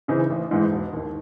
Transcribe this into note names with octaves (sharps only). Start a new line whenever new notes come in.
C#3 E3 C4 D#4
A1
G#2 E3 G#3 D#4
E1
D#2 D#3